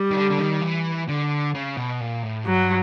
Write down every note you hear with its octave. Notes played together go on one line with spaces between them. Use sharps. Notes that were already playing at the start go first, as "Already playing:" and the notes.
Already playing: G3
D#3
D3
D3
D#3
E3
D3
C#3
B2
A#2
A2
G2 F#3